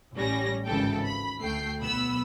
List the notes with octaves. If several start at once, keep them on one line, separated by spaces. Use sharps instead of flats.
A1 A2 G3 C#4 A#6
G#1 C#2 C#3 E3 A4 G5
B5
D2 A3 G5 C7
B1 B3 B5 E6